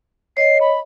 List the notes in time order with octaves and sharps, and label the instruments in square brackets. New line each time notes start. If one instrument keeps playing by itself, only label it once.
[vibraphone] C#5 D#5 [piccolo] C7
[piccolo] B5